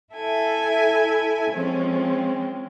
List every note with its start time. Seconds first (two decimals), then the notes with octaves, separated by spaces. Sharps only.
0.14 E4 A4 E5 G#5
1.50 F3 G#3 C4 C#4